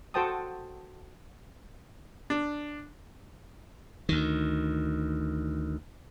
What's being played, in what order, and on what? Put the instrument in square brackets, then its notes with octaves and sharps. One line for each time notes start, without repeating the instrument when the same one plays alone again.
[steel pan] F#4 A4 C5 G5 A5 D#6
[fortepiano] D4
[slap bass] D2 D#3